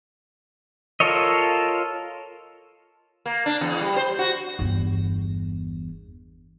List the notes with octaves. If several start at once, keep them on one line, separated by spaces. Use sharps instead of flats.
F4 A4 A#4 C#5 D#5
A#3
D4
E2
G3
C5
F#4
G1 E2